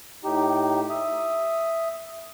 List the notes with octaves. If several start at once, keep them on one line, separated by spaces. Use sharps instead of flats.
A2 D#4 G4
E5 D#6